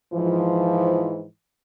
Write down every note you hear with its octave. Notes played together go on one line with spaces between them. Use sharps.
G#2 E3 F3